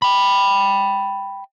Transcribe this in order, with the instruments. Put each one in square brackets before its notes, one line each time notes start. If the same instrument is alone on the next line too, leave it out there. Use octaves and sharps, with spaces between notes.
[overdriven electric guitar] G5 B5